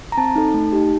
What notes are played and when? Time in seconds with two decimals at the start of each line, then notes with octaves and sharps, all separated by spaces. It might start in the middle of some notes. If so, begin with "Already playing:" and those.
0.12 A#5
0.17 C4 A5
0.36 D#4 A4
0.54 A3
0.73 D#4 G4